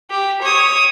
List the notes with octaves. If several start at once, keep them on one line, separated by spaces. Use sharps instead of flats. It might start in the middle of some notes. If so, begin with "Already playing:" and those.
G4
C#5 D#6